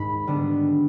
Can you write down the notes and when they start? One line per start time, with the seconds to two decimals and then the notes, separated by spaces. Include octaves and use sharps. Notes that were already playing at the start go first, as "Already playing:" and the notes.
Already playing: G#2 D#3 G#3 B5
0.27 D3 G3 B3 D4